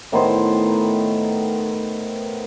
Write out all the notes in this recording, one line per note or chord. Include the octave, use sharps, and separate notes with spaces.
A2 D#3 B3 C5